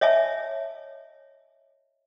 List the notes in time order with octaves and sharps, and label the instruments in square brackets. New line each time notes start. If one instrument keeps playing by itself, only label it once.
[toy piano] C#5 D#5 E5 G#5 A5